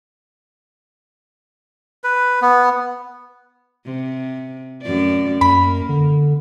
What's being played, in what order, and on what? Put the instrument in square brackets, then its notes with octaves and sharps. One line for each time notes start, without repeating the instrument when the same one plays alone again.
[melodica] B4
B3
[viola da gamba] C3
F#2 A3 D5
[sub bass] F#2 [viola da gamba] A#3 [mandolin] B5
[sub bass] D3